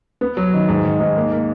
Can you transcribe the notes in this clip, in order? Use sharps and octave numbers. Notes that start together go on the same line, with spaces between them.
B3
F#3
D#3
G#2
D#3
G#2
A#3
A#3